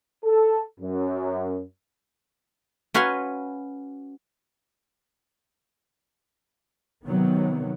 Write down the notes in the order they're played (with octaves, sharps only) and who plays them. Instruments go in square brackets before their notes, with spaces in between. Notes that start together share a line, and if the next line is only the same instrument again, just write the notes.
[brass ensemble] A4
F#2
[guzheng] C#4 F#4 B4 F5 G#5 C6
[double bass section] C3 D#3 F#3 B3